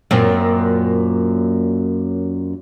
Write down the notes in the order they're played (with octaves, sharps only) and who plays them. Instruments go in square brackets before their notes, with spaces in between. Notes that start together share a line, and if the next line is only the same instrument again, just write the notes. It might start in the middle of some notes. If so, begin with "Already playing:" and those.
[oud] F#2 A#2 C4